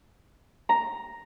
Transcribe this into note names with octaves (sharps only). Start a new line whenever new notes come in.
A#5